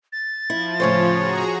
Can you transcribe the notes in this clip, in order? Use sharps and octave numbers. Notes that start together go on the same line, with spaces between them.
A6
F3 E4
A2 C#3 C5 C#5
F#4 G#4 A#5